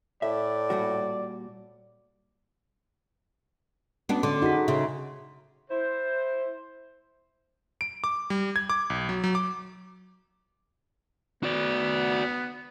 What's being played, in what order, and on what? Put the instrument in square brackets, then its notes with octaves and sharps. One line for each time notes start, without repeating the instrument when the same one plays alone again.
[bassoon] A2 [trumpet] D5 [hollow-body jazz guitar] E5
[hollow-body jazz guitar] A#2 G3 F#4
[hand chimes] A3 C#4 F#4 [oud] B3 D4
[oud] D3 [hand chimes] C6 D6
[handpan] D#4 F#4 [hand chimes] G#4 A4 B6
[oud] C#3 [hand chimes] E5 C6
[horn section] E4 C5
[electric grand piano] D7
D6
G3
G#6
D6
B1
F#3
F#3
D6
[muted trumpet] B3 [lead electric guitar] F#4 D5